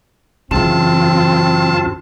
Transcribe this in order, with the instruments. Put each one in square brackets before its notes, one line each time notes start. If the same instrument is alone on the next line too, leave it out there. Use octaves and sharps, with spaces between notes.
[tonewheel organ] F#2 F4 [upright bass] C#3 E3 [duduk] C4 [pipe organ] A5